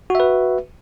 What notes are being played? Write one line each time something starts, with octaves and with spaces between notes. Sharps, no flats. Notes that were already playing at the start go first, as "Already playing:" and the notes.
F#4 B4 E5